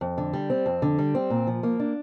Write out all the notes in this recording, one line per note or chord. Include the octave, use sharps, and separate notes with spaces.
F2
D3
G3
C4
F2
D3
G3
C4
A#2
F3
A#3
D4